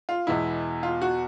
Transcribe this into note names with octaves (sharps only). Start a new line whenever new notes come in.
F4
E2 B2 G#3 E4
F4
F#4